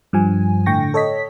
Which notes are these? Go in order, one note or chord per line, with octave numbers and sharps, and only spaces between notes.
G2 F3 G#5
A2 D3 G5 C#6 A#6
A4 C#5 D#5 B6